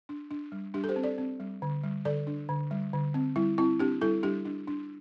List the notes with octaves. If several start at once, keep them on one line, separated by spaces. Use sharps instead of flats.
D4
D4
G3
G3 D4 G4
A4
G4 C5
C4
A4 D5
C4
G3
D3
G3
D3 A4 D5
D4
D3
G3
D3
C4
G3 E4
C4 E4
C4 D4 G4
G3 E4 A4
G3 D4 G4
D4
D4